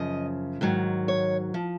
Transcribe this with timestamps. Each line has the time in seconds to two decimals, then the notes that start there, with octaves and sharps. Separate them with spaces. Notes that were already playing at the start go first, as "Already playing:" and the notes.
Already playing: F#2 C#3 F3 D#5
0.61 G#2 D#3 F#3
1.08 C#5
1.54 F3